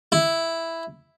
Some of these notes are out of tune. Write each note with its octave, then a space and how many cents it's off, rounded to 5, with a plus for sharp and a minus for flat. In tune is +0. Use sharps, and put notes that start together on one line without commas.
E4 +0